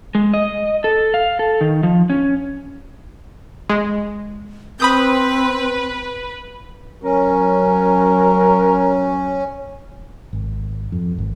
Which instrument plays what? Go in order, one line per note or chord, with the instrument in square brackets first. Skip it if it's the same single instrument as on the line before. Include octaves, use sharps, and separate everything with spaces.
[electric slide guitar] G#3
D#5
A4
F5
A4
D#3
F3
C#4
[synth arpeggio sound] G#3
[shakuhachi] C4 [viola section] B4 [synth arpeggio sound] B5 D#6 G6
[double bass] F#3 [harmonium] C#4 [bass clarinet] A#4
[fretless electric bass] G#1
F2
G#1